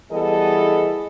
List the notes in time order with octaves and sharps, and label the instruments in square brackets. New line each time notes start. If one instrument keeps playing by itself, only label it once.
[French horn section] E3 G3 B3 G#4 A4 D#5